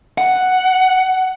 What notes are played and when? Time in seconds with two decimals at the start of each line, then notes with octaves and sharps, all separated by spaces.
0.18 F#5